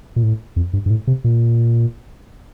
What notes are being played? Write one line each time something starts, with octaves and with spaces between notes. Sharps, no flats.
A#2
A2
F2
G2
G2
A2
C3
A#2